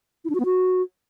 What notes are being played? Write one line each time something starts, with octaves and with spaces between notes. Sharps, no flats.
E4
D4
F#4
B3
F#4